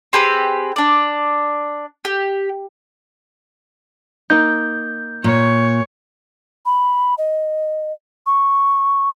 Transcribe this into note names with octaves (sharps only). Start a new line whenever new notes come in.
C4 G4 G#4 B4
D4 D5
G4
A#3 D#4 G6
A#2 C#5
B5
D#5
C#6